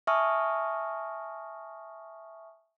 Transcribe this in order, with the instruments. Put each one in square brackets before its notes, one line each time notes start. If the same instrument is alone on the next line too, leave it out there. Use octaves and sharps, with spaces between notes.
[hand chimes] E5 G#5 A5 C#6 D#6 F6